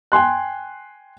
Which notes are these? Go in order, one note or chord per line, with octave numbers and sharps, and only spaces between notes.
G5 G#5 C6 F#6